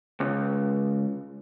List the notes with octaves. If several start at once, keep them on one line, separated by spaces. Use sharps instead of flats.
C#2